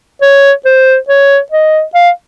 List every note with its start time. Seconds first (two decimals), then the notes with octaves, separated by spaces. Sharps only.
0.22 C#5
0.65 C5
1.09 C#5
1.52 D#5
1.95 F5